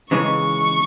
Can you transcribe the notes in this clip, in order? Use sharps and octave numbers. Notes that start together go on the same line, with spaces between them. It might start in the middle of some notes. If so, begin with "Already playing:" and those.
C#3 E3 G#3 D#4 C#6